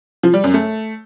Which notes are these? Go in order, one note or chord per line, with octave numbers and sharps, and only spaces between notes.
F3
G3
F#2
A3